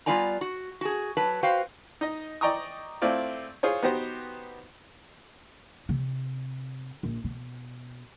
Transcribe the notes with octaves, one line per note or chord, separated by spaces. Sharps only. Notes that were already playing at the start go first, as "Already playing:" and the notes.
G3 B3 F4 D5 G#5 A#5
F#4
F#4 G#4
F#3 B4 A5
F#4 B4 C5 F5 G5
D#4 D#5
D5 D#5 G5 A#5 C#6 D#6
A3 C4 E4 F4 D5
F4 G#4 C5 C#5
B3 D#4 F#4 G4 C5
C3
A#1
B2